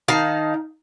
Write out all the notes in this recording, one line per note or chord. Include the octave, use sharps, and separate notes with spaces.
D#3 D#4 F5 A5